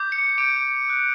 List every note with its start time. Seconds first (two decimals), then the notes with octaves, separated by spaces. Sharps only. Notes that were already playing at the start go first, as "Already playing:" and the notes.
Already playing: D6 G6
0.12 C#7
0.38 D6 G6 D7
0.88 D#6 F#6